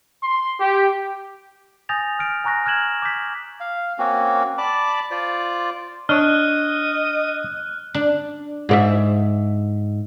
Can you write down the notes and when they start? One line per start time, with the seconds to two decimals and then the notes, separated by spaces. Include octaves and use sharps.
0.23 C6
0.60 G4
1.89 G#5 D#6 G6 A6 A#6 F7
2.19 F6 D7
2.44 G#5 A#5 C#6 F#6 A#6
2.66 F6 F#6 G#6 E7 F#7
3.02 D6 G6 B6
3.60 F5
3.99 A#3 C4 C#4 F#4
4.58 D5 A5 B5 D6
5.11 F4 C5 D5
6.09 D4 C#5 D#5 F6 F#6
7.94 D4
8.69 G#2 D5 E5